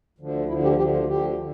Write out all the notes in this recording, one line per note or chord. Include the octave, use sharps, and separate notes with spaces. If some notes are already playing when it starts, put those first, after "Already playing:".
D2 D3 F3
D2 D3 F3 E4
G4
D2 D3 F3 G4
F4
D2 D3 F3 G4
D3